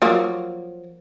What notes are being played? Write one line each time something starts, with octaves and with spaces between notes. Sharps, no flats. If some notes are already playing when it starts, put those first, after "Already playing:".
F3 F#3 A#3